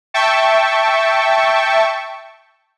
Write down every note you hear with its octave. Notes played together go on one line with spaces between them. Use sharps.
E5 G5 A5 C#6